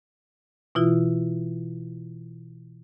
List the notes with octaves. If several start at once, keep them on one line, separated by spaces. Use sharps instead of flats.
B2 E3 E4 F4